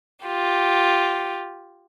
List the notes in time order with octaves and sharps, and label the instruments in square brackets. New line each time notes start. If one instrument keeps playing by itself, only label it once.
[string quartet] F4 G4